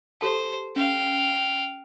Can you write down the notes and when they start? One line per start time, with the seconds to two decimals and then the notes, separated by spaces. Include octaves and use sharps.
0.21 G4 A4 C5 A5
0.76 C#4 F5 G5